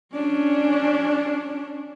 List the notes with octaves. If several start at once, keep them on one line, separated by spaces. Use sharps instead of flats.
C#4 D4